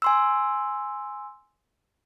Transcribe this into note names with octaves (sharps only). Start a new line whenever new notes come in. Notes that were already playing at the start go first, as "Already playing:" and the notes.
G#5 C6 E6